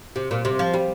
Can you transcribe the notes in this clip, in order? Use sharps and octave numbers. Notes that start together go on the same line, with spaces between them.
C3
A#2
C3
F3
G3